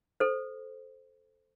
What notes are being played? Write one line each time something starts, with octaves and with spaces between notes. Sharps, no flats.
A4 C5